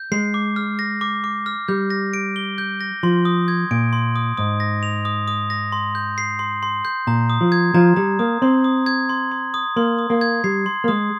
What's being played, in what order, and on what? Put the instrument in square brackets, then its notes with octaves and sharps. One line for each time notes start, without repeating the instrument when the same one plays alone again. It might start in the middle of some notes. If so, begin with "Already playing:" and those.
Already playing: [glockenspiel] G6
[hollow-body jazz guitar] G#3 [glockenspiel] C7
[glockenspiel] D6
F6
A#6
D6
D6
F6
[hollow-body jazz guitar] G3 [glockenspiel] G6
[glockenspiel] A#6
D7
G7
G6
A#6
[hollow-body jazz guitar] F3 [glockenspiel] C6
[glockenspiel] D#6
G#6
[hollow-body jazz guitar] A#2 [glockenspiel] D7
[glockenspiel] C6
D#6
[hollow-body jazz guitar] G#2 [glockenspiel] D#6
[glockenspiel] A#6
F7
D#6
D#6
A#6
C6
G6
C7
C6
C6
G6
[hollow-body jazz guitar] A#2 [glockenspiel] A#5
[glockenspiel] D#6
[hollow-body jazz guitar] F3
[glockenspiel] G#6
[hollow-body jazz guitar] F3 [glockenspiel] A#5
[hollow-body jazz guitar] G3 [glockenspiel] A#5
[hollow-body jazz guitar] A#3 [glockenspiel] D#6
[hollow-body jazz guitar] C4 [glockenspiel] C6
[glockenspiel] D#6
G#6
C6
C6
D#6
[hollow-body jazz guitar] A#3 [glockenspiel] C6
[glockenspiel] D#6
[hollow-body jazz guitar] A#3
[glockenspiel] G#6
[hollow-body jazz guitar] G3 [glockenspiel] C7
[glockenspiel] C6
[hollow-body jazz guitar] A#3
[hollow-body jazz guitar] G#3 [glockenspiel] D#6